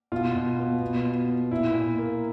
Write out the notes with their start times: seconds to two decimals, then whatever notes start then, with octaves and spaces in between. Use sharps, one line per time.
0.12 B2 F4
0.35 B2
0.59 B3
0.81 B2
1.04 B2
1.28 B3
1.51 A#2 E4
1.74 A#2
1.98 A#3